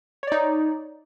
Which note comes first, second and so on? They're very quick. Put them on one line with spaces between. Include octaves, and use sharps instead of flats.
C#5 D5 D#4